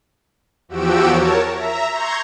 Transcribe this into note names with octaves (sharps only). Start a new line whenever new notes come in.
E2 F3 F#4 G4 E6 D7
A#4 C#5 A5
E5 A#5
A#5 C6 C#6 G6 G#6